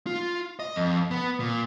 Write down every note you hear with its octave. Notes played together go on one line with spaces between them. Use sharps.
F4
D#5
F2
B3
A#2